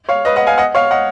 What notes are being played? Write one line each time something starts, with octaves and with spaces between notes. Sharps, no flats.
C#5 F5
B4 D#5
D#5 F#5
F5 G#5
D#5 F#5
C#5 F5
D#5 F#5